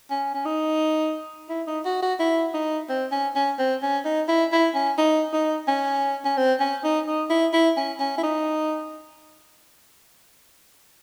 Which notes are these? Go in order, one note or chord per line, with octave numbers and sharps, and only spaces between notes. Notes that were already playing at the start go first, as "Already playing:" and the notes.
C#4
C#4
D#4
E4
D#4
F#4
F#4
E4
D#4
C4
C#4
C#4
C4
C#4
D#4
E4
E4
C#4
D#4
D#4
C#4
C#4
C4
C#4
D#4
D#4
E4
E4
C#4
C#4
E4
D#4